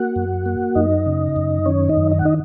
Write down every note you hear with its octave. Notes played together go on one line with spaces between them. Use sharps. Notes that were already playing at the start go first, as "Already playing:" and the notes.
Already playing: A#3 F#4 F#5
F#2
A#3
F#2 D#4 D#5
C#3
F#2
D#3 C#4 C#5
D#4 D#5
F#2
D#5
F#5
D#4 D#5